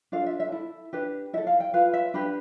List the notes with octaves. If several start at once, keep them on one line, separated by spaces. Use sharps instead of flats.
D4 F4 A4 F5
E5
E5
E4 A4
D4 G4 B4
E4 A4 E5
F5
G5
F4 B4 F5
E5
D4 G4 B4 B5